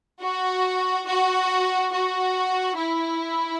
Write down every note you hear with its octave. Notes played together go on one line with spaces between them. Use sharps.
F#4
F#4
F#4
E4